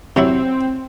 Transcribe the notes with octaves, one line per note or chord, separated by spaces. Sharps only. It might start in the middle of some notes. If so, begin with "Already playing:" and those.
C3 F#3 C4 E4